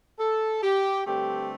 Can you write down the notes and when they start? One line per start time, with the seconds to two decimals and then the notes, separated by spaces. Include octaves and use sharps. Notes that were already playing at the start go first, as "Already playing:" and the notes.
0.19 A4
0.63 G4
1.06 G2 D3 A3 C4 G4